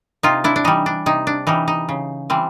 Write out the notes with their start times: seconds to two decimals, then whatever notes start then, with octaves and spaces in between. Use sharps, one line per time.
0.23 C3 D#4 F4
0.44 D4 E4
0.56 D4
0.64 E3 G3 D#4
0.86 D4
1.06 C3 D#4
1.27 D4
1.47 E3 G3 D#4
1.68 D#4
1.89 C#3
2.30 E3 G3 C4